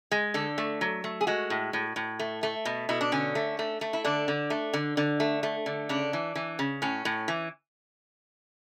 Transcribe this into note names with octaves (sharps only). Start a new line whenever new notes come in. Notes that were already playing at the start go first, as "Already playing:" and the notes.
G#3
D3 A4
A3
F#3
A3
G#4
G#3 F#4
A2
A2
A2
A3
A3
B2
B2 E4
D4
D3 C#4
A3
A3
A3
E4
D3 D4
D3
A3
D3
D3
A3
A3
D3
C#3 D4
E3
E3
C#3
A2 C#4
A2
E3